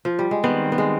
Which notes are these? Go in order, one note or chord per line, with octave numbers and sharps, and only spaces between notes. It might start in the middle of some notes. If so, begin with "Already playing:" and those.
F3
G3
G#3
D#3 G3 B3 C4
B3
G#3